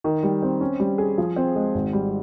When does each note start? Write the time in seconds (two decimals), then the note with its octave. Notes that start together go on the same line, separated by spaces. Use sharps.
0.04 D#3
0.23 G3
0.42 C4
0.61 C#4
0.80 G3
0.98 G#4
1.18 F3
1.36 C4
1.56 G#3
1.74 G#1
1.93 G3